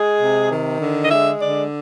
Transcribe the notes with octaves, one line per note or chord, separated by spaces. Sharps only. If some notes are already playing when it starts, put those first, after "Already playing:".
Already playing: G#3 G#4
C3
D#3
D3
D#5
G#3 E5
D3 D5